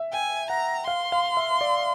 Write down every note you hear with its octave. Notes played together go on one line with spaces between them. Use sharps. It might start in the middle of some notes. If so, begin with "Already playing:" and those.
Already playing: E5
G5 G#5
F#5 A#5
F5 C6
F5
E5
D5